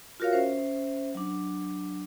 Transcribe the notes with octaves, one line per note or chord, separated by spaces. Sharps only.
F4 F#4 A#4 C#5 F5
C#4 C5 E5
F#3 D4